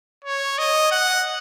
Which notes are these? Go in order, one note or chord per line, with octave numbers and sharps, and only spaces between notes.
C#5
D#5
F#5